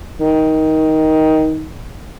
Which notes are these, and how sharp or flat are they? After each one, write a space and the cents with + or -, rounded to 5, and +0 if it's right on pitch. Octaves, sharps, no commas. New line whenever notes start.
D#3 +15